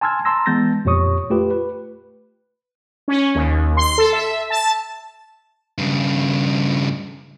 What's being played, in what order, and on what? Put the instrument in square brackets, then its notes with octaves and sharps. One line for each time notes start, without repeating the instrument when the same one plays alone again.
[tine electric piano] G#5 A5 C6 E6 F6 G#6
A5 A#5 C6 E6 A#6
E3 G#3 B3 G6 A6 A#6
F2 A#2 G4 C#5 C#6 D#6
A3 F4 G4 B4
B4
[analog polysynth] C#4
D#2
C6
A4
E5
A5
[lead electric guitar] G2 C#3